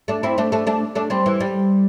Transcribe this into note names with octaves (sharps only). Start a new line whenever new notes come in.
A3 D4
C4 E4
A3 D4
A3 D4
A3 D4
A3 D4
G3 C4
E3
G3